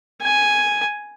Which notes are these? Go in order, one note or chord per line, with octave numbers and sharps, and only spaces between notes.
G#5